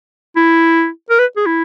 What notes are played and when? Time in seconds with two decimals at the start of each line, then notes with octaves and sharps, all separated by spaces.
0.36 E4
1.10 A#4
1.19 B4
1.37 G#4
1.46 E4